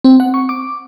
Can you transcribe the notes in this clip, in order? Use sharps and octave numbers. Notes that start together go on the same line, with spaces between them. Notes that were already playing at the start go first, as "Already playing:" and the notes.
C4
F#5
C#6
D6